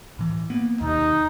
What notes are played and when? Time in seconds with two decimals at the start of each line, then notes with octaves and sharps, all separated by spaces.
0.19 A2 E3
0.50 A#3 B3
0.81 D#2 C3 D#4